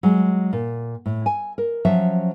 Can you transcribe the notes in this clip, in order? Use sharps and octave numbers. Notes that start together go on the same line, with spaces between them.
F#3 G#3
A#2
A2
G#5
A#4
F3 F#3 C#4 E5